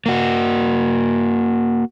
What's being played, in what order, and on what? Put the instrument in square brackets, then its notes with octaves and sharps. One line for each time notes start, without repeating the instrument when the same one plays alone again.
[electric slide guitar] A#3 F#4